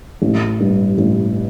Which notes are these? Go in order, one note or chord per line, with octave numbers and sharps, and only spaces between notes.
A1
G2
A1